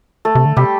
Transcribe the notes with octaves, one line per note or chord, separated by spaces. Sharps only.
A3 A4
C3
D3
C3 G3 G4